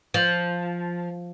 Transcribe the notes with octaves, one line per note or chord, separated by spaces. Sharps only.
F3